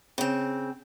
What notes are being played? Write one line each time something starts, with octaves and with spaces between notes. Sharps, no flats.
C#3 C4